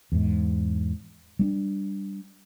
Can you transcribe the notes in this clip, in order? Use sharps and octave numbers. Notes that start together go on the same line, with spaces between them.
E2 G#2
G3 C4 D4